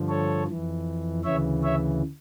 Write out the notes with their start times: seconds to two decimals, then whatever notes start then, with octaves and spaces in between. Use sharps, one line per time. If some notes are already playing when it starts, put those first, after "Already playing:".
Already playing: G2 D3 F3
0.08 A4 C#5
0.48 F2 E3
1.24 D2 C#3 E3 C#5 E5
1.63 C#5 E5